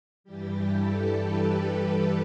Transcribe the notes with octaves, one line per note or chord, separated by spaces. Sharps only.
G2 E3 G3 G4
A4
B4